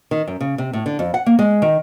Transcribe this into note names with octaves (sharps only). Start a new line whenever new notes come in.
D#3
F#2
C#3
C3
A2
D3
F2
F#5
A#3
G#3
D#3